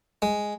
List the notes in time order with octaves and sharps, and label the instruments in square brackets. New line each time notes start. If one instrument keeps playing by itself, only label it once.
[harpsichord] G#3